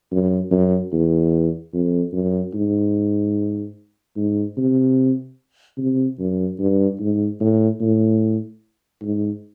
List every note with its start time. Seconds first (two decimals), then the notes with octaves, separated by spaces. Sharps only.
0.11 F#2
0.51 F#2
0.92 E2
1.74 F2
2.13 F#2
2.54 G#2
4.16 G#2
4.57 C3
5.78 C3
6.19 F#2
6.59 G2
7.00 G#2
7.40 A2
7.81 A2
9.02 G#2